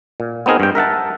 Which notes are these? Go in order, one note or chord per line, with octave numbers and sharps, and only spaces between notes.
A#2
B3 C4 D#4 G#4 A#4
G2 G5
A#4 E5 F#5 A5